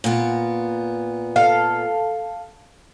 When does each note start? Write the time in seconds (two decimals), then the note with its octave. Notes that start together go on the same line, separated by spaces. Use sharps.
0.04 A#2 B3
1.36 A4 F5